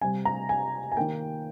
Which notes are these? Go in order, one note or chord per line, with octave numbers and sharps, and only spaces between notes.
C3 G3 C4 G#5
A#5
G#5
G#5
D#3 A#3 G5